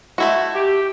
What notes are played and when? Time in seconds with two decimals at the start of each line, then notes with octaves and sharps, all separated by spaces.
0.18 A3 E4 F#4
0.55 G4